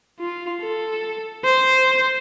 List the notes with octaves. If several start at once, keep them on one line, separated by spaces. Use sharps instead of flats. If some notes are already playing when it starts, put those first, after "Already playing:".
F4
A4
C5